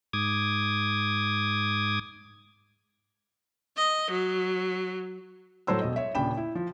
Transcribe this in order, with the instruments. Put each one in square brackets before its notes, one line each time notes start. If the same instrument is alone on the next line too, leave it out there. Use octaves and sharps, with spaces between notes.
[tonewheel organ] G#2 D6 D#6 G#6
[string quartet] D#5
F#3
[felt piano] A2 F#3 A3 C5 A5 E6
E1 A3 D#5
C#5 E5
D#1 C#3 D4 G5 B5 E7
E4
F3